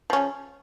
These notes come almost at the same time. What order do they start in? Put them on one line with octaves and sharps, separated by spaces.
F3 C#4 C#3